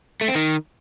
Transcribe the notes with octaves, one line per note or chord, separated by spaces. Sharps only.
A3
C4
D#3